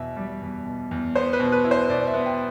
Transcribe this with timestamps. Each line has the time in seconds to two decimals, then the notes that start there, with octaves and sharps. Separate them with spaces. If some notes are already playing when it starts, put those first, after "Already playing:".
Already playing: E2 B2 E5
0.17 G3
0.42 E2
0.66 B2
0.91 E2
1.15 B3 C5
1.33 B4
1.40 B2
1.52 B4
1.64 E4
1.71 C5
1.89 B2 D5
2.07 E5
2.14 B3
2.26 G5